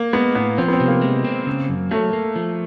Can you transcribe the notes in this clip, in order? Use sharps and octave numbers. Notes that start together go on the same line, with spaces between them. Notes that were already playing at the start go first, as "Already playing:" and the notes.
Already playing: A#3
G#3 B3
A2 B3
F3 C4
B3
C4
C3
A#3
G#3
C4
C#3
F#2
F#3 A3
A#3
F3